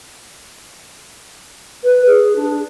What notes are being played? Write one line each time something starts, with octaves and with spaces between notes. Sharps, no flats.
B4
G#4
D4